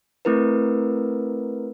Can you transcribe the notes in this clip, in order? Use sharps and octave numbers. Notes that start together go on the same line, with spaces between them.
A3 C4 E4 A#4 B4